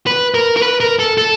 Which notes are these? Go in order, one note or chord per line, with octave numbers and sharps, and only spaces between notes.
B4
A#4
A#4
B4
A#4
A4
A4